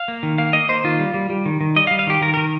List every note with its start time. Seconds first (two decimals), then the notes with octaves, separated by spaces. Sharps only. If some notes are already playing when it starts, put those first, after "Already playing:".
Already playing: F5
0.08 A#3
0.23 D#3
0.38 A#3 F5
0.53 A#3 D#5
0.69 A#3 C5
0.84 D#3 F4
0.99 G3
1.14 G3
1.30 G3
1.46 D#3
1.61 D#3
1.76 G3 D#5
1.87 F5
1.91 G3
1.99 F5
2.07 D#3 G4
2.21 D#3 A#4
2.34 D#3 A#4